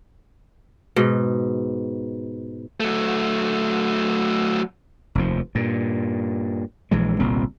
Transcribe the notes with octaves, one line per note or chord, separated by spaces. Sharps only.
G#2 B2
F#3 A3
F1 D#2 F3
G2 A#2
A#1 E3 G#3
G1 C2 A#2 C4